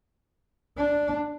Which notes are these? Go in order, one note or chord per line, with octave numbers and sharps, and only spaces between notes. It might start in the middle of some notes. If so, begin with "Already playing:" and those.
D4